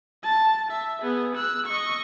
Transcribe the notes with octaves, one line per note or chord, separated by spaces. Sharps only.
A5
E5
B3 G#4
E6 F#6
D#5 C#6